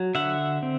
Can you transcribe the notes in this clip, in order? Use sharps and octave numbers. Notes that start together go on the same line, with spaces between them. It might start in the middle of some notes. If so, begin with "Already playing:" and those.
Already playing: F#3
D3 E5 F#5
C4